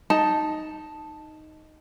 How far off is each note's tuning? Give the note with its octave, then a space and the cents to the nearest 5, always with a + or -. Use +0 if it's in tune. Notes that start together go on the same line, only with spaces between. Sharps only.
D#4 +0 A5 +0